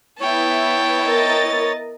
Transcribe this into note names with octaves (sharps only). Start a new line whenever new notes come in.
B3 E4 C#5 G5 A5
A#4 D#5 A6